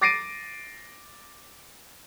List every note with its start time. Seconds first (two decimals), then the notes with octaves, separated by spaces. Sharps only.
0.01 D6 A6 A#6 C7 D7 D#7